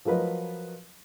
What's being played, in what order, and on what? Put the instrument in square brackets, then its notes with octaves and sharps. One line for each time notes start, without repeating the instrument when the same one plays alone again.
[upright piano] F3 F#3 A#4 B4 D#5